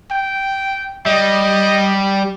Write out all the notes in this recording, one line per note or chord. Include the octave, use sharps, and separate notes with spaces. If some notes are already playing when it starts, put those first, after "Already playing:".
G5
G3 D#5